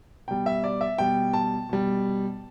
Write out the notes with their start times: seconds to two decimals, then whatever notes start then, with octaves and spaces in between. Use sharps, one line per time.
0.28 B2 G3 G5
0.46 E5
0.64 D5
0.81 E5
0.98 B2 G3 G5
1.33 A5
1.69 B2 G3